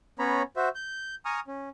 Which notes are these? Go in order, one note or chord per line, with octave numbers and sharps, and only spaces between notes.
B3 C#4 C#5 A#5 B5
F#4 C5 E5
G6
G#5 A#5 C#6 D#6 F6
C#4